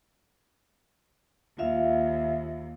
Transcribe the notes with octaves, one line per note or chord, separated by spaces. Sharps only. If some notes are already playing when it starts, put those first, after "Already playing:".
D#2 F4 E5 F5